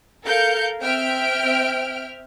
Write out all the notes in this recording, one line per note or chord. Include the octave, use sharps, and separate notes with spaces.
A4 A#4 F5 G6 C#7
C4 E5 G5 F6 D7